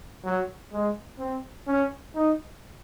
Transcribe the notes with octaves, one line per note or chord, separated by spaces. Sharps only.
F#3
G#3
C4
C#4
D#4